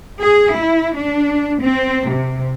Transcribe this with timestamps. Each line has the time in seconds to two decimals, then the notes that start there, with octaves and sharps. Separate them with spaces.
0.20 G#4
0.55 E4
0.96 D4
1.61 C4
2.08 C3